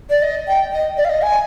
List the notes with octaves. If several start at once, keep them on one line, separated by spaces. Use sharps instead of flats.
D5
D#5
G5
D#5
D5
F5
D#5
G#5